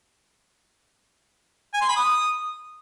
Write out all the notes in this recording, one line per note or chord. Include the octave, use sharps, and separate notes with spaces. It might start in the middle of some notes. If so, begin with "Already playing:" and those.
G#5
C6
B5
D#6